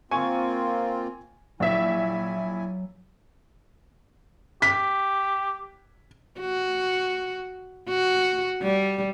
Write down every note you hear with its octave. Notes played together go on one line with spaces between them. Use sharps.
A#3 C4 F4 G#5 C#6
A#1 F#3 E4 E5 G#5
G4 B6
F#4
F#4
G3